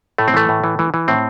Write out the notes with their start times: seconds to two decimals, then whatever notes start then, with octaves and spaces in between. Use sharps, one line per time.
0.18 A2 A3
0.28 C4
0.34 E3 A3
0.49 A2
0.64 E3
0.79 E3
0.94 E3
1.08 A2 C4